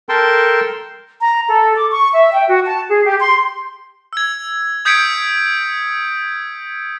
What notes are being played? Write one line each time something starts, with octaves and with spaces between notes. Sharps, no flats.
A4 A#4 G5 A5 C6
A#5
A4
D6
C#6
E5
G5
F#4
A5
G#4
G4
C6
E6 G#6
D#6 G6 G#6 B6 C#7 D7